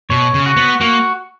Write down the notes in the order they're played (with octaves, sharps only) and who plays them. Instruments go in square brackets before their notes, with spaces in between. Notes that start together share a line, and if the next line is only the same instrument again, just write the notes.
[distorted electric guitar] B2 [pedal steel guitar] C#5
[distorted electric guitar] C#3
[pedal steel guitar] F#4
[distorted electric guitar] B3
[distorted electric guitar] A#3 [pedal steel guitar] F#4